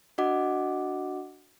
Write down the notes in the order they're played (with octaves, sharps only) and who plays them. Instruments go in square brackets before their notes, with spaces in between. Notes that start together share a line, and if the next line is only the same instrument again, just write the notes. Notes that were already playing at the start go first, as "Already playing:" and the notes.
[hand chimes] D4 F#4 D#5 F#5 D6